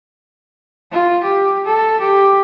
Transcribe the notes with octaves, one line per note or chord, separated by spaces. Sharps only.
F4
G4
A4
G4